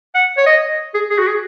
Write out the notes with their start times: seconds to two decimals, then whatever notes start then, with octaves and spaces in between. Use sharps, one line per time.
0.15 F#5
0.37 C#5
0.46 D#5
0.94 G#4
1.10 G#4
1.18 F#4
1.28 G#4